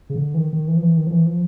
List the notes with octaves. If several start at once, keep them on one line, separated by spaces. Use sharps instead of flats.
C#3
D3
E3
D#3
D#3
E3
F3
E3
D#3
F3
E3
F3